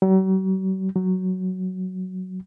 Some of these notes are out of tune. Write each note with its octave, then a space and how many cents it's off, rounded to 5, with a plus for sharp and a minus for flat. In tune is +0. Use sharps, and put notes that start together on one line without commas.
F#3 +45
F#3 +5